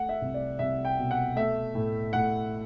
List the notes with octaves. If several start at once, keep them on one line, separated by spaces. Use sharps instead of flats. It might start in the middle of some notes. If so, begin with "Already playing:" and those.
Already playing: A3 F#5
E5
C2
D5
C2 E5
G5
B2
F#5
A3 E5
A2
A2 F#5